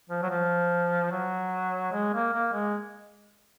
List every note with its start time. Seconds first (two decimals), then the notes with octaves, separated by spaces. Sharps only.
0.10 F3
0.23 F#3
0.30 F3
1.11 F#3
1.92 G#3
2.13 A#3
2.33 A#3
2.53 G#3